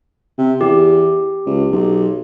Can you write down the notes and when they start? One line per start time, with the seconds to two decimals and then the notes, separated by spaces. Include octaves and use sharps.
0.38 C3
0.61 E2 G4
1.46 C#2
1.71 B1